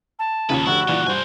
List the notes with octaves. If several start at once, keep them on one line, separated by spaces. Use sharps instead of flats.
A5
D#2 A#2 C#3 B4 C#5
F1 D3 E4 F#4
G2 A#2 C#3 E3 D5 F#6
G2 F4 C5 G#5